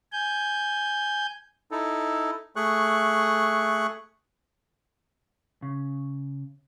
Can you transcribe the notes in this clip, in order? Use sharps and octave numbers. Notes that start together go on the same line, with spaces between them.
G#5 G6
D#4 E4 A4
A3 G#4 C#6 F#6
C#3